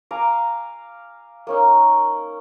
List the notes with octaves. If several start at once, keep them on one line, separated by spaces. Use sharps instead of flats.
F5 G#5 A#5 D6
A#3 C#4 D#4